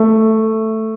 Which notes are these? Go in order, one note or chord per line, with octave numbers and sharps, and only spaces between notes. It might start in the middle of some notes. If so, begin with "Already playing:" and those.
Already playing: A3